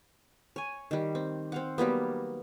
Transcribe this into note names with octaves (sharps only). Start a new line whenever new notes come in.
C#5 G#5
D#3 G3
C4
C4 F5 F#5
F#3 G3 A#3 B3